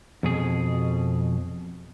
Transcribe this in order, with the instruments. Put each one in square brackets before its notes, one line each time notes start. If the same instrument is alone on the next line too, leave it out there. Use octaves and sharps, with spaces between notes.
[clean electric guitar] F2 B2 G#4